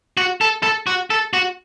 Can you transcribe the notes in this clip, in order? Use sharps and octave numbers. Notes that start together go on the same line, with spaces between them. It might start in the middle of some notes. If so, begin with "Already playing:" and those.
F#4
A4
A4
F#4
A4
F#4